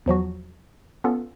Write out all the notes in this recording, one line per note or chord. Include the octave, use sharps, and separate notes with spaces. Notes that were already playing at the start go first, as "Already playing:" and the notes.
E2 F3 F#3 F#4
B3 C#4 F4 A4